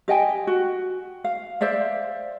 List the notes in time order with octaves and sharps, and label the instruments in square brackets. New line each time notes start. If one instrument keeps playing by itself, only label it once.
[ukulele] G4 D#5 G5 G#5
F#4
F5
C5 D5 E5 F5